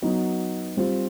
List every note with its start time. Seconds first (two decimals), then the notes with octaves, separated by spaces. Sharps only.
0.02 F#3 B3 D#4 F#4
0.77 G3 C4 F4